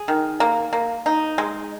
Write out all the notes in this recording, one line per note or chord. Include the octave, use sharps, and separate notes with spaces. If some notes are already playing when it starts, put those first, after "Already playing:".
Already playing: G#4
D#3
A#3
A#3
D#4
G#3